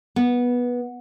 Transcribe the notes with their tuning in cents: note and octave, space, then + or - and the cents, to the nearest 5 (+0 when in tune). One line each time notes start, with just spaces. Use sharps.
B3 -15